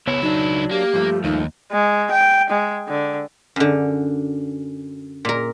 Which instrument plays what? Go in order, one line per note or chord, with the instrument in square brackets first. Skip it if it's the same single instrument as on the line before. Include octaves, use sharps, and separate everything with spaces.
[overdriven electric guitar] C#2 E4 [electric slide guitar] B3 C#5
[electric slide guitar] F#3 D4 [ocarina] D#4
[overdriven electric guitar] A#3 [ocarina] G4
[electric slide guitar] G2 F3 A3
[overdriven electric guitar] D#2 [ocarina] D#4
[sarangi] G#3
G5
G#3
D3
[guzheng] F#2 D3
A#2 A#4